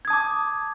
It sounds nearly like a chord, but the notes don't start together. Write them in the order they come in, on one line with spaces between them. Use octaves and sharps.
G#6 D#6 A5 D6